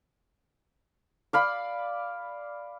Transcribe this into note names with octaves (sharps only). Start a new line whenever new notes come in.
D5 F5 B5